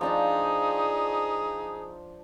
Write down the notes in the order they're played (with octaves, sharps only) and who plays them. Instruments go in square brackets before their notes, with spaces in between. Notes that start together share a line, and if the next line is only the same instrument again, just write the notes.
[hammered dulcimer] F3 D4 A5 [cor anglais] D#4 [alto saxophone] G#4